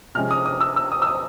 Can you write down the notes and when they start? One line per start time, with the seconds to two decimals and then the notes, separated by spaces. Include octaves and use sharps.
0.15 C3 F3 G#3 C#4 F6
0.31 D#6
0.46 D#6
0.61 E6
0.76 E6
0.92 D#6
1.02 E6
1.07 D#6